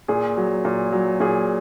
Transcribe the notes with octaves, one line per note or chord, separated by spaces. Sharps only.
A#2 G#4
F#3
A#2
F#3
A#2 G#4